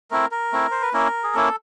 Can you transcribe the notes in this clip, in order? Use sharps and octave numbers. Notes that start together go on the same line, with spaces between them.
A3 C4 E4 A#4
A#4
A3 C4 E4
C5
B4
A#3 C#4 E4 A#4
G#4
A#3 C#4 E4 A4